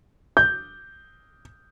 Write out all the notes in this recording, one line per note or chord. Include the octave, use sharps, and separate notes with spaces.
G6